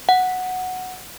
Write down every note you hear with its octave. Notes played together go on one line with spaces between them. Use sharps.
F#5